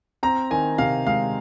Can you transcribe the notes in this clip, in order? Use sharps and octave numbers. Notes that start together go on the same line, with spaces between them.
C4 A#5
D#3 G#5
C3 F5
G#3 F5